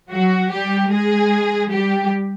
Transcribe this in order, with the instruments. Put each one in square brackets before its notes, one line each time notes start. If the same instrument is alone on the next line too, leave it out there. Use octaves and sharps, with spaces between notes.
[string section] F#3 F#4
G3 G4
G#3 G#4
G3 G4